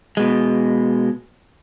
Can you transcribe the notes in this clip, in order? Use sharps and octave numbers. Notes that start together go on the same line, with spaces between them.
B2 G#3